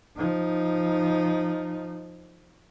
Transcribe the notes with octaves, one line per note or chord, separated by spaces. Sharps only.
F3 D#4